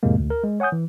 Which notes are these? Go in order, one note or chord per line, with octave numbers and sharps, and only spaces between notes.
F2 A2 C3 G#3 A#3
D2
A#4
G#3
C#5 F#5 G#5 D#6 G6
E3